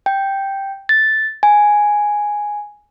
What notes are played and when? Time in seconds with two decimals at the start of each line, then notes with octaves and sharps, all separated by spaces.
0.06 G5
0.89 A6
1.43 G#5